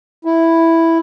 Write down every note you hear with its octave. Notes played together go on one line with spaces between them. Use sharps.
E4